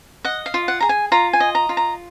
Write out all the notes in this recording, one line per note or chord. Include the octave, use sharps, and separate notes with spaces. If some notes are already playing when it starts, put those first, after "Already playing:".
D#5 F#5
F5
F4
F#5
G#4 A#5
G#5
F4 A#5
G#5
D#5
A#5
F4
A#5